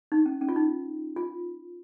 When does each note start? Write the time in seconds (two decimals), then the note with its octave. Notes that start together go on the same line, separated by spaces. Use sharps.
0.12 D#4
0.26 C#4
0.41 C#4
0.49 F4
0.56 D#4
1.16 F4